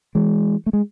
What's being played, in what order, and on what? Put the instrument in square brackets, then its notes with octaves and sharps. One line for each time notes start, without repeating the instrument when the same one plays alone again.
[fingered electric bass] E3 G#3
A3
G#3